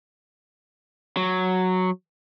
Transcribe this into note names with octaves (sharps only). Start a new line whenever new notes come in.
F#3